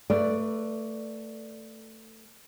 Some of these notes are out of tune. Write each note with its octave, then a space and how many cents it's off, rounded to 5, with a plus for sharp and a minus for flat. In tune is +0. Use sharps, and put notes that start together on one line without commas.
A3 +15 B4 -5 D5 +0